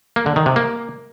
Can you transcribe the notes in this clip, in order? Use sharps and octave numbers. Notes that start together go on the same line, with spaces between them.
A#3
D3
D#3
C3
A#3